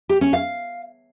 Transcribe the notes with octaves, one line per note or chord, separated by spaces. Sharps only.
G4
C#4
F5